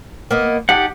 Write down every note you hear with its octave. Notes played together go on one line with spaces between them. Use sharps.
A#3 B3 D#5
D#4 G4 A4 F#5